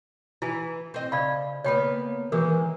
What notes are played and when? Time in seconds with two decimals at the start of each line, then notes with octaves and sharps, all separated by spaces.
0.42 E3 E4 G#5
0.94 C4 D#5
1.12 C#3 D5 F5 B5
1.64 C#3 A#3 B3 C#5 G5 B5
2.32 D#3 E3 G#3 A#3 G#4 A#4